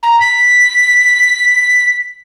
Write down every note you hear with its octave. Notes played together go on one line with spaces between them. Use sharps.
A#5
B6